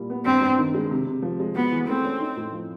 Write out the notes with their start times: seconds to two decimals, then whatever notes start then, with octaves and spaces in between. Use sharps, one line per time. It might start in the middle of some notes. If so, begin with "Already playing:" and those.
Already playing: A#2 G3 E4
0.10 B3
0.25 G2 C4
0.41 G2
0.58 D#3
0.74 G#3
0.91 C3
1.07 C3
1.22 F3
1.40 G#3
1.55 B3 F#4
1.71 E3
1.88 A3 C4
2.04 C#4
2.20 D#4
2.37 A2
2.52 F3